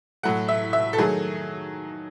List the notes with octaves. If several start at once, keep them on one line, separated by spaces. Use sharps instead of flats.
A2 F#3 A3 F#5
E5
E5
A4
D#3 F#3 A3 G#4